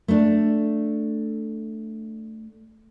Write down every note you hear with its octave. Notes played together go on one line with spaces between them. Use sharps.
A3 D4